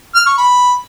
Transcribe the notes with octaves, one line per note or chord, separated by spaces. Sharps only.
F6
C#6
B5